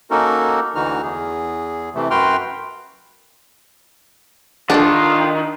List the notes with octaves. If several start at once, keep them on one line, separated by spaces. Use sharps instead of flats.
A#3 C#4 D#4 F#4 A4 A#4
D2 D3 E3 D#4 F#4 F6
E2 G#4
C3 E3 A3
F#2 F#4 B4 G5 C6 F6
D3 D#3 C#4 D4 F4 A4